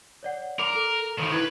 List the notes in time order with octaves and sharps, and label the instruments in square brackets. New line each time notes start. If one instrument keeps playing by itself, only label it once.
[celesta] C#5 D5 F#5
[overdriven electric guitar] A#4 [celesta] A#5 D6
[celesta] A4
[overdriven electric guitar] D#3 F3
[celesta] E4 G#6 [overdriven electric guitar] B4